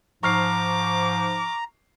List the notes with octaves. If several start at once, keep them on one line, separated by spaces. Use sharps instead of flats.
G#2 F3 A#5 C#6 D6 F6 C7